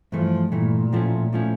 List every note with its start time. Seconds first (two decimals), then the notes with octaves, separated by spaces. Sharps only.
0.12 G2 E3 F3 A3
0.52 G2 A#2 E3 A3
0.93 A2 F3 A3 C#4
1.33 A2 F3 A3 C#4